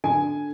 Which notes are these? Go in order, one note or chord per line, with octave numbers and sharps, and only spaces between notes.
D3 G#5